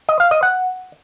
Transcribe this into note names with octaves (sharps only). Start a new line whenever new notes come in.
D#5
F5
D#5
F#5